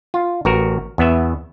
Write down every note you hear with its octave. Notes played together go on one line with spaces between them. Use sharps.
F4
A1 F#4 A#4
E2 B3 E5